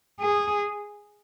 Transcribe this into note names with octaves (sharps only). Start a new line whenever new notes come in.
G#4